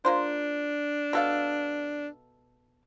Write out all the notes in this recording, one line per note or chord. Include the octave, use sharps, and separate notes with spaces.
A#3 D4 F4 C5
B2 A4 F5